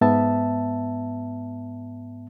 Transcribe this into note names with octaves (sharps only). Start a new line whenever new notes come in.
G#2 B3 E5 A5